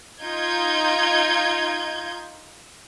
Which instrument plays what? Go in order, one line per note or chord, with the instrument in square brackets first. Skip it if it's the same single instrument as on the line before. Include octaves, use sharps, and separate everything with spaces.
[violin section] D#4 F4 G6 G#6